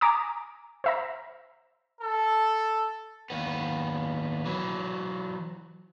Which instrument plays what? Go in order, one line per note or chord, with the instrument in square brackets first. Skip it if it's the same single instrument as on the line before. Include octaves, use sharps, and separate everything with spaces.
[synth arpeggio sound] G#5 A#5 D6 D#6
C5 E5 A#5
[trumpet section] A4
[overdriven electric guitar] D#2 B3
E3 F#3